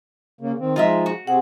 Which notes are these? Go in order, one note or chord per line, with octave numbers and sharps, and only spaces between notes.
C#3 A#3
D#3 C4
F3 G#3 D#4 F4 D#5 E5
F#4
C3 C4 G#4 F#5